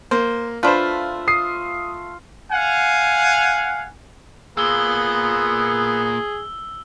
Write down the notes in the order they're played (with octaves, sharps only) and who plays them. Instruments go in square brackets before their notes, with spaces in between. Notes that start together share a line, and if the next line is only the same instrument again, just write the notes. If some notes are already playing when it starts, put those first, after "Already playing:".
[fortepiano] A#3 [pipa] C5
[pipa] A3 D4 [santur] F4 [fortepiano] B4 C5
[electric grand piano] D#6 C7
[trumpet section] F5 F#5 G#5
[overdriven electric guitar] A#2 A#3 [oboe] B3 [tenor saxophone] G#4 [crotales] E6 G7